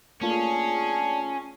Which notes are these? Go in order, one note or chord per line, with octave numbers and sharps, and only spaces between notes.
A3 A#3 C#4 D4 F4 G#4 C#5